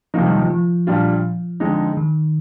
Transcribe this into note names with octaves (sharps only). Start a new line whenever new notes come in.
F2 C3 D#3 F3 A#3 D#4
G3
F3
F3
A#2 G3 D4 F4
F2 D3 G#3 D#4
D#3